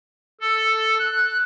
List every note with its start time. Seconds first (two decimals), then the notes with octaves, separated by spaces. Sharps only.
0.41 A4
0.99 F#6